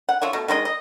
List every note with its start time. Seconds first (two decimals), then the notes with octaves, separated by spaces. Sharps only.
0.09 F#5
0.22 F3 C#5 E5
0.33 B2 A3
0.48 D#3 G#3 F4 D#5
0.65 D#5